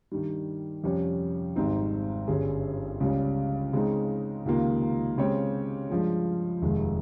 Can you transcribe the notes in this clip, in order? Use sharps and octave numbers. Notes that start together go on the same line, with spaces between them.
G2 D#3 G3
F2 C3 G3 C#4 G4
G#1 G#2 G3 C4 D#4
G1 G2 G3 C#4 G#4
C#2 C#3 G3 C#4
C#3 G#3 C4 D#4
C#2 C3 D#3 A#3 F4
C#3 G#3 C4 G4 C#5
G2 F3 G#3
F1 D#2 D#3 G#3